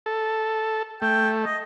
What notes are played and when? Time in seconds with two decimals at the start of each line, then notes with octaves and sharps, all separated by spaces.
0.06 A4
1.02 A3 G5
1.45 D#5